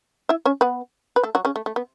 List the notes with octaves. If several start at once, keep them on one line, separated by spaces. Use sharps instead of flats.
E4 E5
C#4 C#5
B3 B4
B4
A3 A4
F#3 F#4
C#3 C#4
A3
A3
B3